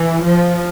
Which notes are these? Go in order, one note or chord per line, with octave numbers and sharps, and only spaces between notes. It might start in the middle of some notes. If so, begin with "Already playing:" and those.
Already playing: E3
F3